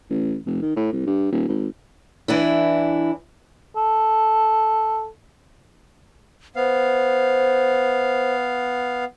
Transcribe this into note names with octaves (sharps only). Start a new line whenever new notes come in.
A1
F1
D#3
A2
C2
G2
D#1
G#1
E3 D4 E4
A4
B3 C5 F5